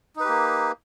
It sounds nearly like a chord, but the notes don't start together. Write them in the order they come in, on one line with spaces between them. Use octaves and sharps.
D#4 B4 G4 A#3